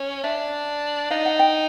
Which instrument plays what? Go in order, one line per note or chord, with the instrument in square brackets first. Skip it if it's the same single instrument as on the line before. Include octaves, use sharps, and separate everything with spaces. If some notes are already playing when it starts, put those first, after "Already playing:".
Already playing: [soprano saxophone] C#4
[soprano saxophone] D4 [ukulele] E5
[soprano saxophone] D#4 [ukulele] F5
[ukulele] F#5
G5